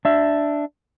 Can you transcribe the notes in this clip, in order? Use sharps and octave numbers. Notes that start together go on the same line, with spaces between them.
D4 E5